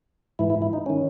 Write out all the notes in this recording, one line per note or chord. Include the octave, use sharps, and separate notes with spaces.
G#2 E3 E4
E4
E4
D#4
D#3 C#4